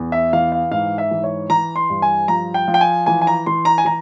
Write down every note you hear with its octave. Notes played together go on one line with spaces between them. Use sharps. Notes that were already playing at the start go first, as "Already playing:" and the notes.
Already playing: E2
E5
E3 F5
F5
G#2 F5
E5
E3
C#5
E3 A#5
C6
G2
G#5
F3 A#5
G5
F3
G5
G#5
E3 G#5
G#5
A#5
E3 C6
A#5
G#5
E3 A#5